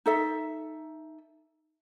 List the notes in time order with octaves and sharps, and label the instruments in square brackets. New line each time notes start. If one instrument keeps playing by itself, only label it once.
[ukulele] D#4 A4 E5